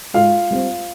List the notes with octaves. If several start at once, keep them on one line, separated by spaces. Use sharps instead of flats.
G#2 F4 F5
G3 C4